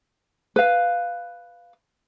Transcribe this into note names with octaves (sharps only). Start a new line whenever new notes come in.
B4 F5